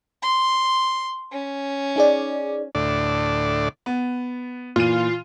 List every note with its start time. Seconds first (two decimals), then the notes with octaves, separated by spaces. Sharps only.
0.23 C6
1.32 C#4
1.96 D#4 G#4 D5
2.75 D2 A2 D4 D5
3.86 B3
4.76 A#2 E3 F4 D#7